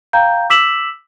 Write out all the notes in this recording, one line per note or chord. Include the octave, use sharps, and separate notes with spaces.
F5 G5 A#5 G6
D6 E6 B6 E7 F#7